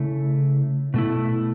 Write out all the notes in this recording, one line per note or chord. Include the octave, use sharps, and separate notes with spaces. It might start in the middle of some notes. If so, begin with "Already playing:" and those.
Already playing: C#3 A3 E4
B2 A3 E4